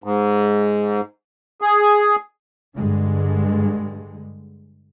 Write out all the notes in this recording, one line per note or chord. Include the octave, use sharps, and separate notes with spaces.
G#2
G#4
G2 D3 G#3